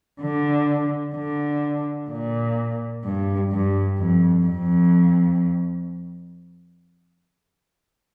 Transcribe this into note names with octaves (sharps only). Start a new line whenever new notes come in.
D3
D3
A#2
G2
G2
F2
F2